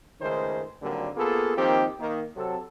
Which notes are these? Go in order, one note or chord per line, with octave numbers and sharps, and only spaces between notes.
C#2 D#3 A3 D#4 G#4 C5
G#1 D3 F#3 G3 A#3
A#3 B3 F4 G#4 A4
D#3 F3 A#3 C4 D#4 G4
D#3 A#3
C3 F#3 A4